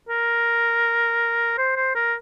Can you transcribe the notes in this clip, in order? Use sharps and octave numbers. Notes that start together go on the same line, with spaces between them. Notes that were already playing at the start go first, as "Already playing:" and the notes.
A#4
C5
C5
A#4